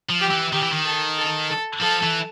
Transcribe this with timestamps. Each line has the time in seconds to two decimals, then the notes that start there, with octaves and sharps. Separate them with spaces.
0.10 F3
0.21 G4
0.31 E3
0.53 D#3 G4
0.63 E3
0.72 D#3
0.85 A4
1.18 A4
1.50 A4
1.82 F3 A4
2.03 E3